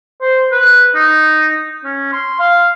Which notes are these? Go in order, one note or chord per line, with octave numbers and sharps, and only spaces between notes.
C5
B4
D#4
C#4
C6
F5